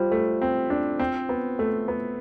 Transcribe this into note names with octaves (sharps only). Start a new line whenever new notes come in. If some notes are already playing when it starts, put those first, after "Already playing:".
Already playing: G3 F4 C5
A3
C4
D4
C4
B3
A3
B3